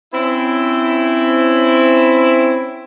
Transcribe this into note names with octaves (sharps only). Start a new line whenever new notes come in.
C4 C#4 E4